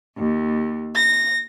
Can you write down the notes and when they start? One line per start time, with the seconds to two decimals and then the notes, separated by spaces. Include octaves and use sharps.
0.17 D#2
0.94 A#6